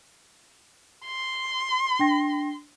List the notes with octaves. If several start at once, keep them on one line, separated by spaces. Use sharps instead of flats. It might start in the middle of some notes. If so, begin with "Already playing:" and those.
C6
D4 G5 A#6